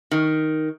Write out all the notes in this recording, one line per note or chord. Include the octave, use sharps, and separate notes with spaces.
D#3